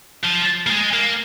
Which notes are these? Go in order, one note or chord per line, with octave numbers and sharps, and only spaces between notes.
F3
A#3
G#3
A#3